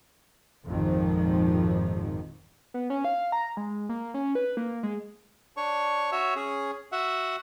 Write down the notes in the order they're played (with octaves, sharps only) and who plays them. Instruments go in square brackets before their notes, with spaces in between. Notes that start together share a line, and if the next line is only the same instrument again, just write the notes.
[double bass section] G#1 F2 A#2 D#3 F3
[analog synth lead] B3
C#4
F5
A#5
G#3
A#3
C#4
B4
A#3
G#3
[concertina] D4 C#5 C#6
F#4 C#5 E5
C#4 G#4
F#4 E5 F#5